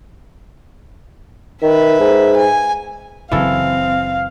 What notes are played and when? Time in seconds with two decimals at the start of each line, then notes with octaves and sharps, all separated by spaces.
1.62 D#3 B4 E5
2.00 G#2
2.36 G#5
3.32 F#1 C#3 E3 F#3 C4 A4 F5